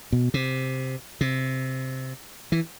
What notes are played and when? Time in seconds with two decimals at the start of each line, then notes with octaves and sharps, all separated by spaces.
0.12 B2
0.34 C3
1.21 C3
2.52 E3